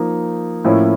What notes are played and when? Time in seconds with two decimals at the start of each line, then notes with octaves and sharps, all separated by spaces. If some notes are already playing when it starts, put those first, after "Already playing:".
Already playing: F3 A#3 D#4
0.64 A2 F3 A#3 C#4 E4